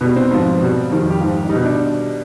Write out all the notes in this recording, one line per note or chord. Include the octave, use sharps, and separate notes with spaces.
B2 G3 B3
C4
G#2 F3
B2 G3
F2 D#3 G3
G4
G#2 F3
D4
G3 D#4
B2
D4